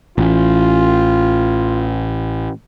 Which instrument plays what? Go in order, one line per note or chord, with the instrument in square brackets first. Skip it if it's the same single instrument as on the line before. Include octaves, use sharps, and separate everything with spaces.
[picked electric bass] A1 [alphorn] F4